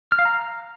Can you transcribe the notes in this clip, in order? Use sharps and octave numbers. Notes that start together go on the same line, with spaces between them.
F6
F5
A#5